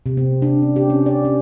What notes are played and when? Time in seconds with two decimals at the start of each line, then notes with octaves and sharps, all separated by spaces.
0.06 C3
0.17 C4
0.42 D4
0.62 C#4
0.76 G4
0.90 C#4
1.06 D5
1.25 C#4